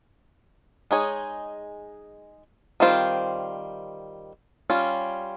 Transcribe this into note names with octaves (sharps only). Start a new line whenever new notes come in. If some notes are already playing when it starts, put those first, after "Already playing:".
G#3 D#4 G#4 C#5
D#3 G3 C4 F4 C5
G3 C#4 F4